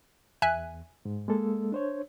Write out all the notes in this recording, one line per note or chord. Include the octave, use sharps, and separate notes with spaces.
E2 E5 G#5 F#6
G#2
G#3 A#3 A4
D4 C5 C#5